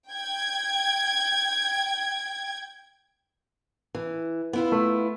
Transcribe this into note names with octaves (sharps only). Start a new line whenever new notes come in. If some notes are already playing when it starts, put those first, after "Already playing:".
G5 G#6
E3
B3 E4 F4
A3